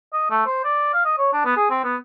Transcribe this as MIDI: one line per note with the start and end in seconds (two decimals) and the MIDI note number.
0.13 0.27 75
0.30 0.43 57
0.46 0.63 72
0.64 0.92 74
0.93 1.04 77
1.05 1.14 75
1.18 1.28 73
1.33 1.40 62
1.45 1.52 59
1.57 1.67 68
1.70 1.79 60
1.84 1.96 59